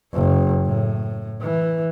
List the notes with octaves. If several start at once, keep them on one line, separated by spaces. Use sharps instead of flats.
F#1
A2
E3